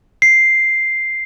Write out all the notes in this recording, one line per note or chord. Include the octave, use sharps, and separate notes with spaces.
C7